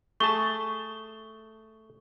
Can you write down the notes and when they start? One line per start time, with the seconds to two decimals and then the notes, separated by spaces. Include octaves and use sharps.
0.20 A3 G#4 A5 C#6 G7